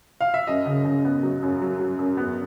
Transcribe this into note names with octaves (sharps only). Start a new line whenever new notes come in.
F5
E5
F#2 D#5
C#3
C#3
B3
F#3
F#2
F#3
F#3
F#2
B3